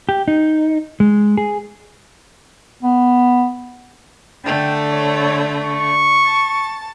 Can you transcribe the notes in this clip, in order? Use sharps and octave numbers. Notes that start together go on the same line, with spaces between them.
G4
D#4
G#3
G#4
B3
D3 A3 G5
C#5
C#6
A5